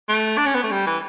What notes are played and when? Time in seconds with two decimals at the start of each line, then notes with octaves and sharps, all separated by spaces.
0.09 A3
0.37 D4
0.46 C#4
0.55 B3
0.63 A3
0.71 G3
0.87 E3